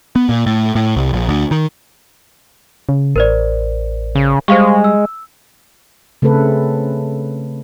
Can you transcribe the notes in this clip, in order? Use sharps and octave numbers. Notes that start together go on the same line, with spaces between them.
B3
A#2
A2
A2
C2
A#1
D2
D#3
C#3
A1 A#4 C5 D5
C#3
G3 G#3 C5 F5 C#6
E6
C#3 A3 C4 A4 B4